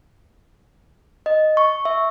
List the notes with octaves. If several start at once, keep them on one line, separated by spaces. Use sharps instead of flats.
D#5
C#6
E5